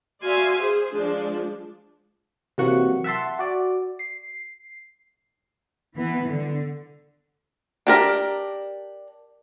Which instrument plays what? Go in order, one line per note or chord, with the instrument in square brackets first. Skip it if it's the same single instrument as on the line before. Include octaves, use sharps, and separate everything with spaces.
[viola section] F#4 D5 E5 F5 G#5 C6
G#4 C5
F3 G#3 D4
[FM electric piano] C3 E3 F#3 A#3 F#5 C#6
E5 F#5 A5 C6
F#4 D5
C7
[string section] E3 B3
D3
[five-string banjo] D4 G4 A#4